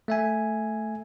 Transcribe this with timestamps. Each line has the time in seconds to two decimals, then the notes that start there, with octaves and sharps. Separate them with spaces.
0.08 A3 E5 G#5